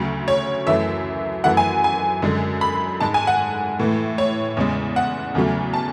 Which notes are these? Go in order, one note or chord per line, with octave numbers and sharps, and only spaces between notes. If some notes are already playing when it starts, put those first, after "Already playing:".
Already playing: D2 C#3 F#3
C#5
F#2 E3 A3 E5
F#2 E3 A3 F#5
G#5
G#5
F#2 D3 G#3
B5
G#2 G#3 A5
G#5
F#5
A2 E3 A3
C#5
E2 C#3 G#3
F#5
E2 C#3 F#3 A3
A5